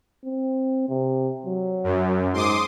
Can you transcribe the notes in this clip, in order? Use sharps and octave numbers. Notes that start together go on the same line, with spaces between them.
C4
C3
F#3
F#2
G#2 C6 D6 D#6